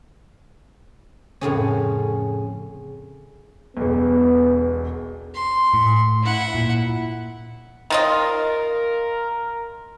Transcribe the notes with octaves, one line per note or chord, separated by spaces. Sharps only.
F2 A2 C#3 C#4
E1 B1 B3
C6
A2
E4 F#5
A#2
D#3 F4 A#4 D#5